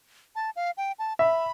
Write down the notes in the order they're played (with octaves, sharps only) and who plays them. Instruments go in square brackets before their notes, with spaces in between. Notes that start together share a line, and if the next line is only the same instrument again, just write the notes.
[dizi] A5
F5
G5
A5
[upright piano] E5 [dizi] B5